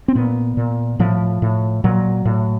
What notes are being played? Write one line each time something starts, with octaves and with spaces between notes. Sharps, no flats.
C4
A#2 B3
A#2
A2 F3
A2
A#2 F#3
A2